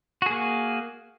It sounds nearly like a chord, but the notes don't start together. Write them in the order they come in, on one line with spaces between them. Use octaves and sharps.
F#4 G#4 A#3